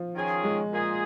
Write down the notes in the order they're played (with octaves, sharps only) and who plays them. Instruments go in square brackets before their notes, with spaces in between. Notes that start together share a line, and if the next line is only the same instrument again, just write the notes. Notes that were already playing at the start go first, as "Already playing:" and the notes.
Already playing: [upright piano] F3
[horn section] D#3 C#4 F4 G#4
[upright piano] G#3
[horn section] A#2 A#3 F4 G#4